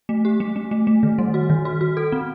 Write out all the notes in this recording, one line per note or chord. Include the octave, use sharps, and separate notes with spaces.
A3
G4
A3
A3
A3
A3
D#3
G3
F#4
D#3
F#4
F#4
A4
C4